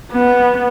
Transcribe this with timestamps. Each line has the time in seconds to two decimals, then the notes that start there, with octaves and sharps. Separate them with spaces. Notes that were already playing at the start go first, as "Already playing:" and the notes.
0.12 B3